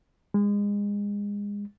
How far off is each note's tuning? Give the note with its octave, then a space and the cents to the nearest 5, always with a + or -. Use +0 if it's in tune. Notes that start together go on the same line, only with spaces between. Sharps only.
G#3 -30